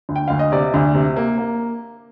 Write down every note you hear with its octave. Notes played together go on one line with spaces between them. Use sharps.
D2
G5
D2 F5
D#5
C3 D5
D2
C3
A#3
A#3